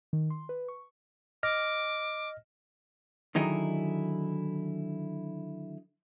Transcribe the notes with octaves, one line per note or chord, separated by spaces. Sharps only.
D#3
C6
B4
C#6
D#5 D6 F6 A#6
D3 D#3 F#3 D#4 E4 G#4